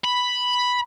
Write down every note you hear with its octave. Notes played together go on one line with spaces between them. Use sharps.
B5